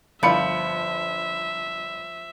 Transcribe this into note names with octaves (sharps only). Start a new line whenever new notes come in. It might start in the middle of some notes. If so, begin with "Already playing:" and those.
G1 F3 E5 B5 C#7